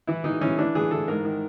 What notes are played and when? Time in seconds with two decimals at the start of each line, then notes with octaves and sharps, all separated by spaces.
0.07 E3 E4
0.24 E3 D#4
0.41 E3 C#4
0.58 E3 D4
0.75 E3 G#4
0.91 E3 A4
1.08 G#2 A#4
1.25 D#3